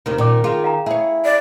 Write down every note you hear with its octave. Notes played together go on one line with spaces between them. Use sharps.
D#2 C3 D#3 A#4
A#2 D#3 C#4 D5 D6
D#3 F4 G#4
F5 G5 A#5
E4 G#4 C#5
D5